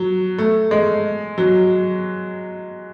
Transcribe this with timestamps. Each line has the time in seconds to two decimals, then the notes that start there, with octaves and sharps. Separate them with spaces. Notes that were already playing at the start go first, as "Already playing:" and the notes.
Already playing: F#3
0.38 A3
0.71 G#3
1.38 F#3